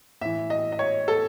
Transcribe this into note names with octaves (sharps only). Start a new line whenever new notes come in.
A2 E3 E5
D#5
D#5
C#5
A4